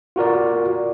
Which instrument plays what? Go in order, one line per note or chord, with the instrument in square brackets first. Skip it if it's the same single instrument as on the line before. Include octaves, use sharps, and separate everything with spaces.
[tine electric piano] F4 F#4 A#4 D5